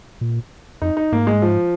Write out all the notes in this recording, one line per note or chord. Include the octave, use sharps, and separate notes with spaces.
A#2
F2 D#4
D#4
G#2 A#3
G#3
F3